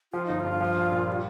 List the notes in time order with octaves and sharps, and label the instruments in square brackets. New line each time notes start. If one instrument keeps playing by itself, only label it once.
[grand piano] F3 [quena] F4
[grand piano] G1 [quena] D#4
[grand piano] G2 [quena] F4
[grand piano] F3
A#1
A#2
G3